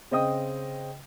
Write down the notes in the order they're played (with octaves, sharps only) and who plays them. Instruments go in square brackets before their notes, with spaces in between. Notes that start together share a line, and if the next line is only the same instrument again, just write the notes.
[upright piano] C#3 C4 D#5 G5 D#6